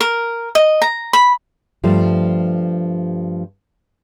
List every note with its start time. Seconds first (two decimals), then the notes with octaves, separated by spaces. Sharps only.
0.01 A#4
0.55 D#5
0.82 A#5
1.13 B5
1.84 G2 F3 G3 A3